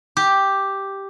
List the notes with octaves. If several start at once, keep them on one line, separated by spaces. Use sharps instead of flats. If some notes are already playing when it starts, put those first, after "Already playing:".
G4